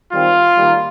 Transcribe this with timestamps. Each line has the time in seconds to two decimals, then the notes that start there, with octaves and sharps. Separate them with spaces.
0.12 D#3 G3 C4 F4
0.56 D#3 G3 A#3